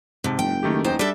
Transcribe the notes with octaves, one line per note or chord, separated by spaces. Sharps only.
G#2 C3 A5
F#1 G5
D#3 A3 G4
E2 D#4 C5 G5
G3 D4 A4 D5 E5